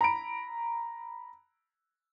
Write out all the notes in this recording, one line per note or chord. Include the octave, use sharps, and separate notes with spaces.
A#5 B5 D7